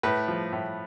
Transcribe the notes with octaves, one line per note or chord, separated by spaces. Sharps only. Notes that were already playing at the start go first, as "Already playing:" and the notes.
A2 B4
F3
A2